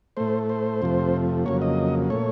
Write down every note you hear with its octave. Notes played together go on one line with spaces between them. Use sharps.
A2 A3 C5
C5
F2 C3 F3 A3
F2 C#3 F#3 A#3 C#5
D#5
A#2 A3 C#5